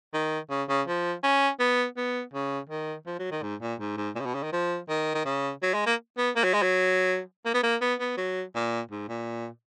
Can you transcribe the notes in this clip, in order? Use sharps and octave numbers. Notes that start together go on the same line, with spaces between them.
D#3
C#3
C#3
F3
C#4
B3
B3
C#3
D#3
F3
F#3
D#3
G#2
A#2
G#2
G#2
A#2
C#3
B2
C#3
D#3
F3
D#3
D#3
C#3
F#3
G#3
A#3
B3
A#3
F#3
G#3
F#3
A#3
B3
A#3
B3
B3
F#3
A#2
G#2
A#2